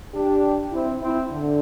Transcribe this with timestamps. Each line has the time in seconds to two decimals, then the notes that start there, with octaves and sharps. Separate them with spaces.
0.13 D4 G4
0.72 C4 E4
1.01 C4 E4
1.31 D3